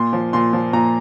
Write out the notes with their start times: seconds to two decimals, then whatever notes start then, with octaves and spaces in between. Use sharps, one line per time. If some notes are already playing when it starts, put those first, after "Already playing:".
Already playing: A#2 C6
0.13 F3
0.33 A#2 C6
0.53 F3
0.73 A#2 A#5